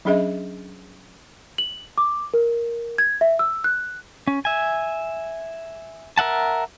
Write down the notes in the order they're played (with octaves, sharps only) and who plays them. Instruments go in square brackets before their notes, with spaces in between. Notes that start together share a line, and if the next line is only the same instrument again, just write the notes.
[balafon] F#3 C#4 D4 G#4 D#5 E5
[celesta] F#7
D6
A#4
G#6
E5
E6
F#6
[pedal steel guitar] C#4
E5 G#5
A#4 E5 F#5 A5